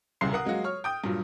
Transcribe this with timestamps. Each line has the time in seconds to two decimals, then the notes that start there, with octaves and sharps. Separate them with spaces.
0.21 D#1 C2 C#3 C6 C7
0.33 A#4 F#5 D#6
0.45 F#3 G#3 A#3 F#4
0.64 C#5 C#6 F6
0.84 G5 D#6 G6
1.04 G2 A#2 F#3